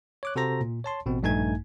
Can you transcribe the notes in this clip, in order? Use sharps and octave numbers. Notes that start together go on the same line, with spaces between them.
C#5 D6 F#6
C3 F#4 A4 C5 A#5 A#6
A#2
C#5 A5 C6
A1 B2 C4
A#1 G2 A3 D#4 G#5 G#6